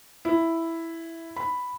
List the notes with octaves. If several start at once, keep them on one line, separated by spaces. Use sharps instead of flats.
E4
B5